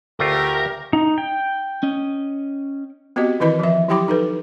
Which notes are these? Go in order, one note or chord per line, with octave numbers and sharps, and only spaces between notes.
D2 A3 F4 G4 A#4
D#4
G5
C#4 D#5
B3 C4 F#4 G4 D#5
D#3 E3 E4 B4 D#5 B5
F3 E5
F#3 E4 G4 G5 B5 D6
D#4 A4 B4